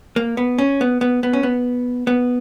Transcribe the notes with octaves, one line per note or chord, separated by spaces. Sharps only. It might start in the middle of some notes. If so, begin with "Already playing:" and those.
A#3
B3
C#4
B3
B3
B3
C#4
B3
B3